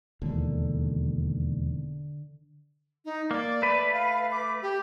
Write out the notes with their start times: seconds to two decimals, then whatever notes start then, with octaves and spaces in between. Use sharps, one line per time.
0.22 E1 D#2 D3
3.05 D#4
3.31 A#3 D5
3.62 A3 B4
3.93 F5
4.32 D6
4.62 G4